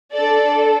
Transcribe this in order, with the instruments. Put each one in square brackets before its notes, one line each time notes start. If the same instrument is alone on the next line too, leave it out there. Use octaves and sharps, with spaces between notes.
[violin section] D4 A4 D5